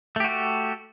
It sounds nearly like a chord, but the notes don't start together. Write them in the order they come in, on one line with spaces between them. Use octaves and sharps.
A3 G4 F#4 A4